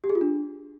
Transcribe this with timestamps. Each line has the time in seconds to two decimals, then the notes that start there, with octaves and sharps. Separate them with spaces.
0.04 G4
0.09 G#4
0.15 F4
0.21 D4